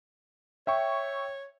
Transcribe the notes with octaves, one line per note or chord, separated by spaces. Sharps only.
C#5 E5 G5 C#6